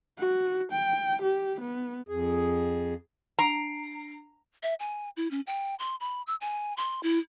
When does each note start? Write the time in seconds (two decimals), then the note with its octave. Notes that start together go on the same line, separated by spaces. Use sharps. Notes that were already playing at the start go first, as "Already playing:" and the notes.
0.19 F#4
0.72 G5
1.22 G4
1.61 B3
2.08 F2 G#4
3.39 D4 A#5 C7 D7
4.63 E5
4.80 G#5
5.17 E4
5.31 C#4
5.47 G5
5.79 C6
6.00 B5
6.27 E6
6.41 G#5
6.77 C6
7.03 E4